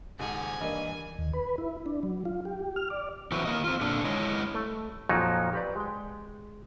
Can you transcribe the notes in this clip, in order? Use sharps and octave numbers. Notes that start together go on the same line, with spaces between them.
D#1 G#2 C#3 F#5 G#5
G2 E3 A#3 D#5
D#2
B4
E4
D4
F#3
F4
G4
F6
D5
D3 E3 F#3 C4 E4 F#4
A#3 D#5
C4 F4
A#2 D3 D4 A4
G#3 E4 C#5 D#5
A3
F2 A#2 F3 F#3 D#4
G4 B4 D5
G#3 G5